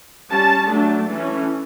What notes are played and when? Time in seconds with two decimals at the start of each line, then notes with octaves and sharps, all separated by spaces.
0.30 G3 C#4 A5
0.70 F#3 A3 D4
1.09 E3 A3 C#4